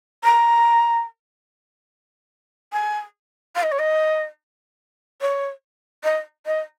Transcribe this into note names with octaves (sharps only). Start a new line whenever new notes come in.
A#5
G#5
F5
D#5
C#5
D#5
C#5
D#5
D#5